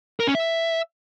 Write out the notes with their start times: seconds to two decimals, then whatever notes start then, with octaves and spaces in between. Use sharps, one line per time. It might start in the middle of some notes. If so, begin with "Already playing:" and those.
0.20 A#4
0.27 C#4
0.35 E5